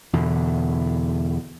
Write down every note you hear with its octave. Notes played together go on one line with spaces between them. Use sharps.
E2 B2 D3